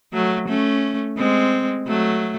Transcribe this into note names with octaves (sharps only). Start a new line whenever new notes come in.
F#3 A3
A3 C#4
G#3 C4
F#3 A3